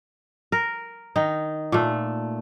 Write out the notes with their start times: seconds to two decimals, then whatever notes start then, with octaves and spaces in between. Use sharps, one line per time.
0.52 A#4
1.16 D#3 D#4
1.72 A#2 A3